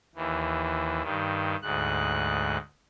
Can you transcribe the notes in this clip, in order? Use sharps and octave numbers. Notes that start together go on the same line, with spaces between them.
D#2 E3
G2 D#3
D2 G#2 F#6